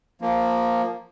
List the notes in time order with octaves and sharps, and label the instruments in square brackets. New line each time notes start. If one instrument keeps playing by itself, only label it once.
[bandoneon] F3 A#3